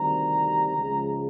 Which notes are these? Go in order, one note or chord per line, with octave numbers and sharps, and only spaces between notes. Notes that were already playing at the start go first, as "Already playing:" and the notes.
Already playing: D2 C3 D#3 G3 C4 A#5
C#2 C#3 F3 G#3